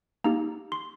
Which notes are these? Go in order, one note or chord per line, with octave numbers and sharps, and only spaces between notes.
A#3 D#4 G4 A#5
C6